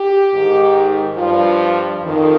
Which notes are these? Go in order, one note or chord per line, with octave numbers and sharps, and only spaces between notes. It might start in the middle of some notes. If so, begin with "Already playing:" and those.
Already playing: G4
G#2 D#3
G2 F3 F4
F2 D#3